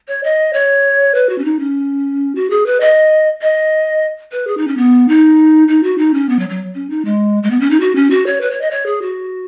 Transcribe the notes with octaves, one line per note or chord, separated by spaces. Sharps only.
C#5
D#5
C#5
B4
F#4
C#4
D#4
C#4
F#4
G#4
B4
D#5
D#5
B4
G#4
D#4
C#4
B3
D#4
D#4
F#4
D#4
C#4
B3
F#3
F#3
C#4
D#4
G#3
G#3
B3
C#4
D#4
F#4
C#4
F#4
C#5
B4
C#5
D#5
C#5
G#4
F#4